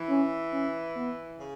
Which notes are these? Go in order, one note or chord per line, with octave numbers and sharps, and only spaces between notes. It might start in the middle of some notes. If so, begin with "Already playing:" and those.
Already playing: E3
C#4
C#4
B3
C#3